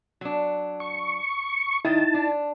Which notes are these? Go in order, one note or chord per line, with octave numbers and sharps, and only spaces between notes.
F#3 D4
C#6
D#3 D#4 E4 D#5 G5 A5
D4